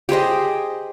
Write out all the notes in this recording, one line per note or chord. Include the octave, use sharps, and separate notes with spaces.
G4 G#4 C5 D#5